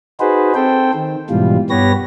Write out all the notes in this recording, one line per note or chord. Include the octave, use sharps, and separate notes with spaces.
D#4 F#4 G#4 B4 C5
C4 A4 C5 G5
D#3
G#2 B2 E3 G3 F4
G2 B3 G4 B4 C#5 A#6